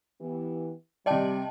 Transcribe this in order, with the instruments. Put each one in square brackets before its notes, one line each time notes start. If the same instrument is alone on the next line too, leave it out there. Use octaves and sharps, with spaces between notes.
[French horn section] E3 B3 G4
[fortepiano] C3 D5 [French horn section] G3 [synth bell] D#5 G5 A5